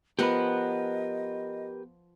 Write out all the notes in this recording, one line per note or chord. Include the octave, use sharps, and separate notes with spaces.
F3 B3 G4 A#4 B4 D#5 F#5